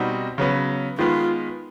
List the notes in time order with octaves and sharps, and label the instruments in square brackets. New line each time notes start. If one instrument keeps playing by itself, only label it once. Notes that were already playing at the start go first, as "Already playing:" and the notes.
Already playing: [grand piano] B2 G3 C4 D#4 F#4
C#3 F#3 B3
[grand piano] D#3 G#3 B3 [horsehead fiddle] F4